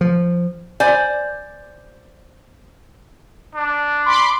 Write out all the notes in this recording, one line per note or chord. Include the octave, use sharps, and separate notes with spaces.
F3
C5 D5 G#5
D4
B5 C6 D6